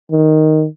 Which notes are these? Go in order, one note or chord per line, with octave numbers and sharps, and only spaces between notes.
D#3